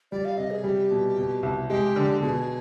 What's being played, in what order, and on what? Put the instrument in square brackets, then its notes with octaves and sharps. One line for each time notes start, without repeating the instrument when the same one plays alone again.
[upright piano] G3 [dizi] D5
[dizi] F5
[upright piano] C3 [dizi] D#5
[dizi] G#4
[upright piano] G3 [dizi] G4
[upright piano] B2
B2
C2
[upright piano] G#3 [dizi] G4
[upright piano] D3
[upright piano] B2 [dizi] G#4